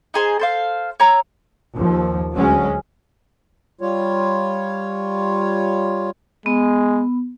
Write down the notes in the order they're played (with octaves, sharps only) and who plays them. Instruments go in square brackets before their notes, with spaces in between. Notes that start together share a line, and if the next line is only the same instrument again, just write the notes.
[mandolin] D#4 G#4 C5
A4 C5 F5
C#5 A#5 E6
[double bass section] D#2 F3
D2 F#3 G#3 C#4
[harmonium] G3 F4 C#5
[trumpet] G#3 [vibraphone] B3